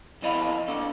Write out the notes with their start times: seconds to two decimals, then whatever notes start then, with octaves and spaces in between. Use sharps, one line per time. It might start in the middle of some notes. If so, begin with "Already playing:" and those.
0.22 F2 E3 D#5 F5 B5
0.68 A#3 D4 A4